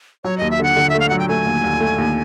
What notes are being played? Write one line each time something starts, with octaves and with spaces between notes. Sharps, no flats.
F#3 C#5
D#2 D#5
E5
D3 F#5
D3
E5
A3
F5
F#3 F#5
G5
A3 G#5
D#2
D#2
A3
D#2